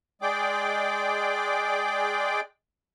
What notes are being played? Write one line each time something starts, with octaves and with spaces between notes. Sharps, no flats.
G#3 G#4 D5 G5 D6